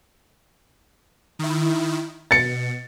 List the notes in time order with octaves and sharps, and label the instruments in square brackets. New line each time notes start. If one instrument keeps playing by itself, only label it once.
[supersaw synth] D#3 E4
[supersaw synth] B2 [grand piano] A6 C#7